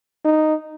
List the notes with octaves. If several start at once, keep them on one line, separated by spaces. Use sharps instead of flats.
D#4